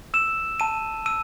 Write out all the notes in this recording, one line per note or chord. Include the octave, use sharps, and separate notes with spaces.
E6 E7
A5 D#7
E6 D#7